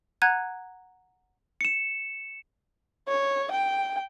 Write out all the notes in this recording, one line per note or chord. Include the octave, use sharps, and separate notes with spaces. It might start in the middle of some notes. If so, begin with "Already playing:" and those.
F#5 A#5 F#6 G#6 D#7
C#7 E7
C#5
G5